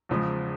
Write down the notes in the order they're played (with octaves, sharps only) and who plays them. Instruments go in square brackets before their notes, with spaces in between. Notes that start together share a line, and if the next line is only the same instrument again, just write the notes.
[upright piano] E2 C#3 F3 G#3